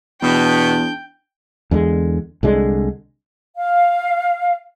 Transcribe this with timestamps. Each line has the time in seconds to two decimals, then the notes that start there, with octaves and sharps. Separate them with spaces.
0.22 E2 B2 D4 G5
1.71 E2 D3 G#3
2.43 C2 D3 G#3 D4
3.57 F5